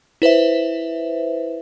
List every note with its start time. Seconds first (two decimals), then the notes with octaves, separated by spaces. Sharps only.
0.22 E4 B4 C5 E5